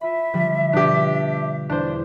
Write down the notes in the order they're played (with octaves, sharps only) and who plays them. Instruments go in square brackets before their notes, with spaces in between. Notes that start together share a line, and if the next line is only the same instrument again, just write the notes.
[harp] F4 B5 [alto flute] E5
[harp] D3 F3 G3
[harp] B2 [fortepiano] D4 G4
[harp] E2 [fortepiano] D4 C5